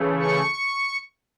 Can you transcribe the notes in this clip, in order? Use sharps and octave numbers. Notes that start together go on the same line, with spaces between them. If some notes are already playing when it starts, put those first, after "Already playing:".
Already playing: C#3 E3 A3
C#6